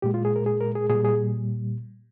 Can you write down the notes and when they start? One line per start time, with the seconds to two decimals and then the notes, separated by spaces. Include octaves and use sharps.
0.02 A#2 G#3 G4
0.14 F4
0.25 G#4
0.36 A#4
0.46 G#4
0.61 A#4
0.75 G#4
0.90 A#2 G3 G#4
1.04 G#4